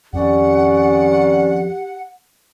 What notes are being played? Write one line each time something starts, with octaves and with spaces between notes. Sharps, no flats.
F2 D#3 C#4 G4 D5 F#5